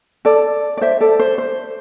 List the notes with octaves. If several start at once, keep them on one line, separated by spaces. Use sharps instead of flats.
A4 D5
D5
C5 E5
A4 D5
C5
C5